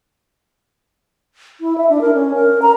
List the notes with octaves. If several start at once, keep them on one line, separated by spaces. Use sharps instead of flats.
E4
E5
D4
A#4
C#4
A#4
A#5